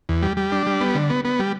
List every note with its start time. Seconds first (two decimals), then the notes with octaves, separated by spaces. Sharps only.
0.09 E2
0.22 G3
0.37 G3
0.52 D4
0.67 G3
0.81 B3
0.95 D3
1.10 B3
1.25 B3
1.39 G3